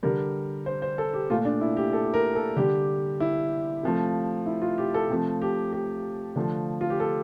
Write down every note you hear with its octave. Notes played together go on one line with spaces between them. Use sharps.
D3 G3 A#4
C5
C5
A4
G4
A#2 A3 F4
D4
E4
G4
A4
A#4
A4
D3 G3 G4
E4
C3 F3 A3
E4
F4
G4
A4
C3 F3 A3
G4
G4
D3 F3 A3
F4
G4
A4